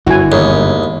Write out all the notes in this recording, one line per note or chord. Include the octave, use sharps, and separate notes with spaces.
G1 F#2 E4 F#4 G#5
E1 D#2 C#5